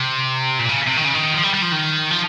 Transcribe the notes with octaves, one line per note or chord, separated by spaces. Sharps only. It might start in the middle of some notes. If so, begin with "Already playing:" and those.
Already playing: C3
A#2
C#3
C3
D#3
C#3
D#3
F3
G3
G3
F3
D#3
F3